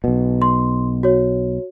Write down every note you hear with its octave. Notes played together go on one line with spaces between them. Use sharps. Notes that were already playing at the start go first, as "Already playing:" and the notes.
B1 B2
C6
F#4 C#5